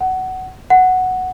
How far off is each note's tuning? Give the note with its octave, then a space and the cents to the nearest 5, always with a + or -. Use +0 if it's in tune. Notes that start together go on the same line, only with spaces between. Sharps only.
F#5 +15
F#5 +0